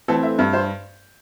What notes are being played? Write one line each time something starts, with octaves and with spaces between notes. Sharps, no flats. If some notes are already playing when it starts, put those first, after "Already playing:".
E3 A3 C4 A4
E5
G2 E5
C5